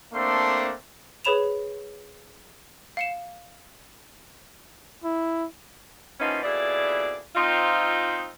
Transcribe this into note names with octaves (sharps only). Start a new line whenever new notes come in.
A3 A#3 C4 D4 A4 C6
G#4 B4 C#5 B5 E7 F7
F5 C#7 E7
E4
E3 F3 A#3 B3 C#4 D#4
F2 B2 E4 G#4 D5
C4 D#4 F4